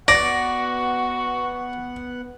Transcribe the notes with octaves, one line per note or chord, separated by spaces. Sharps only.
B3 F#4 D5 F#5 A#6